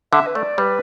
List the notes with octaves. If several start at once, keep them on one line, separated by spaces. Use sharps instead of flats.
D3 E5
B4
A3 D5
G3 B4